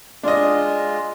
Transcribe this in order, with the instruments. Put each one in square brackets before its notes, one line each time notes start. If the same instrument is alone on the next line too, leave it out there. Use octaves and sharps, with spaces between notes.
[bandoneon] G#3 F4 [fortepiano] D4 D#5